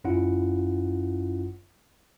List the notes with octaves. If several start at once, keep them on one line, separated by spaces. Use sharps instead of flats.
G1 F#2 C#4 E4 F4 F#5